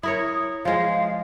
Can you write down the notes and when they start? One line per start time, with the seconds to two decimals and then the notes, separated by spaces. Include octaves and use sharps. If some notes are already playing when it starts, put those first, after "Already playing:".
0.03 E4 A#4 C#5 D#6
0.65 F3 G#3 F5